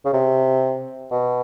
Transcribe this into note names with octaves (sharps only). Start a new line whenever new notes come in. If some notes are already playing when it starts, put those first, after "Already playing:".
C#3
C3
B2